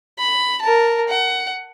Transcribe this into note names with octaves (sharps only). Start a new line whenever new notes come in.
B5
A#4 A5
F#5